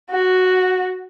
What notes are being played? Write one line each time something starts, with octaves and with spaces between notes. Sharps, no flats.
F#4